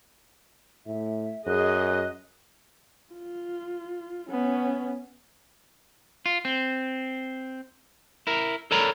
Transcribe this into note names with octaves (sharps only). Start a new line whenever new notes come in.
A2 E5
F#2 G#4 D#5 F#6
F4
B3 C#4
F4
C4
E4 A#4
A4 A#4 C#5 D5 A#5 B5